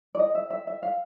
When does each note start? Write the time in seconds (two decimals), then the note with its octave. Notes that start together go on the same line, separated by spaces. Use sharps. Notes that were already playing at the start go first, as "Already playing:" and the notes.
0.15 D5
0.19 D#5
0.35 E5
0.50 E5
0.67 E5
0.83 F5